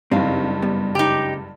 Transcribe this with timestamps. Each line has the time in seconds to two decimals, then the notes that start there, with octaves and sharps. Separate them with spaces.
0.12 F#1 G2 C4 D#4 F5
0.62 G3 B3
0.95 C#2 D#4 G4